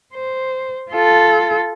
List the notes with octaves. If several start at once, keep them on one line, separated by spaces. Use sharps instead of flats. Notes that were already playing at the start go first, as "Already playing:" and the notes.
C5
F4 A4